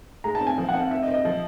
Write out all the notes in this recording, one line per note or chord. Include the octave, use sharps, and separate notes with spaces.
G#3 A#5
A5
C4
G#5
F3
F#5
C4
F5
C4 E5
D#5
C4
D#5
F3